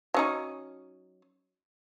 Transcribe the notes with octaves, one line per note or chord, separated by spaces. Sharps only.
F#3 C#4 D#4